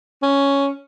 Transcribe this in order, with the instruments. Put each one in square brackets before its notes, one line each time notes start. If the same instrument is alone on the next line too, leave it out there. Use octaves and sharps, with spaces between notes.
[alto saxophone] C#4